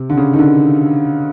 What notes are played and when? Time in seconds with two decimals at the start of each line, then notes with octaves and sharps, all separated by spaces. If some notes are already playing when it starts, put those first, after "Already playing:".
Already playing: C3
0.10 D3
0.17 C#3
0.33 D#3
0.39 D3